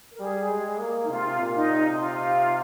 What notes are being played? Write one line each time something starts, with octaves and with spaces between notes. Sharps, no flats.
A#4
G3 G#4
G#3
A#3
D#4
C3 F4
A#2
D#4
C3
D#4
F4